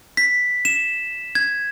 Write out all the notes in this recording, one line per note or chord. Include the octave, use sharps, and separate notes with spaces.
B6
E7
G#6